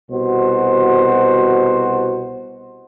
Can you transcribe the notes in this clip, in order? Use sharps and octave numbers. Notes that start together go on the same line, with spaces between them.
C2 B2 F#4 C5